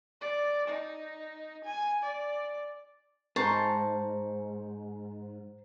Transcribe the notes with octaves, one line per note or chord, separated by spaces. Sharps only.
D5
D#4
G#5
D5
G#2 C5 A5 A#5 C#6